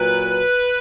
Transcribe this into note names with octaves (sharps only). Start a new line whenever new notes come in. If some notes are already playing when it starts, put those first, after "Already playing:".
Already playing: A#2 F#3 B4